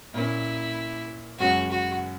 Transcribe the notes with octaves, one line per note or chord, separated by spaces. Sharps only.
A#2 A#3 C#4 E4
F#2 C#3 G#3 C#4 F#4
F#4